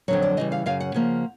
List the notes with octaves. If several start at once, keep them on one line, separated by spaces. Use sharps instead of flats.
F2 D3 F#3 C#5
D5
C#3 E3 G3 D#5
F5
F#2 C#3 F5
F#5
C#3 F3 A#3